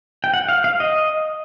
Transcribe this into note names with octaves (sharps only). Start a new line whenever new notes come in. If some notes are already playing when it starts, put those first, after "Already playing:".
G5
F#5
F5
F5
D#5